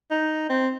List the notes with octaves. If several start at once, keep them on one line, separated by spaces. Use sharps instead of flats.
D#4
C4